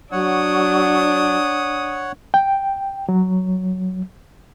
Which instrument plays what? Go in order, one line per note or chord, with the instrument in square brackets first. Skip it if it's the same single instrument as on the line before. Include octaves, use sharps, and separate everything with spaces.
[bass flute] F#3 [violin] D4 [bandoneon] C#5 F#5 [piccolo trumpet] D#6
[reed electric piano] G5
F#3